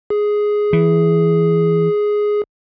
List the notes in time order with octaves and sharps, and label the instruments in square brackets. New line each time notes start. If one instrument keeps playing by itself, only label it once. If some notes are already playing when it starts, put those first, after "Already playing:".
[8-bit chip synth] G#4
[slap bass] E3